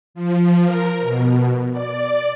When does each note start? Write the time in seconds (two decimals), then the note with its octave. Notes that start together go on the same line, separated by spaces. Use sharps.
0.14 F3
0.66 A#4
1.01 B2
1.72 D5